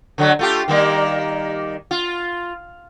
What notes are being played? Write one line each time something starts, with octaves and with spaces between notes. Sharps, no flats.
D3 F#3 A3
A3 F4 G4
D#3 G3 A#3
F4